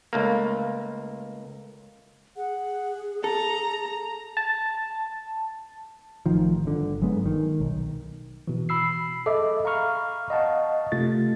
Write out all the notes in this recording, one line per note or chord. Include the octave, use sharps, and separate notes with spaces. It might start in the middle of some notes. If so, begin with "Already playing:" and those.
C#2 A3 A#3
G#4 F#5
A4 A5 A#5
A5
A1 D#3 F3
G1 D3
G1 F#3 G#3 B3
D#3
B1
B2 E3
B5 E6 C7
G#4 A4 D#5 E5 D6
F5 A#5 B5 C#6 F6
D#5 F5 F#5 A5 C#6
C3 A3 F4 A6